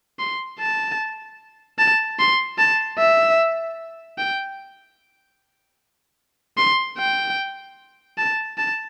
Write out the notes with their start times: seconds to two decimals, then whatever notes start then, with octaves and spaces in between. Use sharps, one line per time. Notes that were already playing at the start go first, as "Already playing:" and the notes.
0.19 C6
0.59 A5
1.79 A5
2.19 C6
2.58 A5
2.98 E5
4.18 G5
6.58 C6
6.98 G5
8.18 A5
8.58 A5